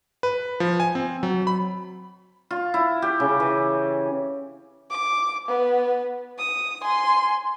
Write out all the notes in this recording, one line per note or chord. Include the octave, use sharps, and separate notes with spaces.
B4
F3
G#5
C4
F#3
B5
F4
E4
G4
C#3
E3
D6
B3
D#6
G#5 C6